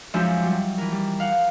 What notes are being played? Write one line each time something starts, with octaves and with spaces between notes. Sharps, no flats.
F#2 F3 G#3 D#4 E5 G6
F#3 G3
E3 A#4
G3
F5 F#5